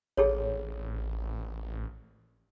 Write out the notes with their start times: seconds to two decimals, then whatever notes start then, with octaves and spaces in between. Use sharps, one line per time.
0.17 A1 G#4 A4 C#5